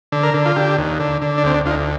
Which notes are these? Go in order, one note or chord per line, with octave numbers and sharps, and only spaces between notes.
D3
A#4
D3
F4
D3 G4
D#2
D3
D3
D4
D2 C4
D4
D2 F4
D#4